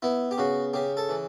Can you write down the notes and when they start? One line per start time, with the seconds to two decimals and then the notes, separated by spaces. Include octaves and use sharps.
0.02 B3 E4
0.31 G4
0.38 C#3 F#4
0.73 C#3 G4
0.97 A4
1.09 E3